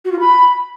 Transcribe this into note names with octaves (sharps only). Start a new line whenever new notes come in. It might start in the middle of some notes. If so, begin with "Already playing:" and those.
F#4
F4
B5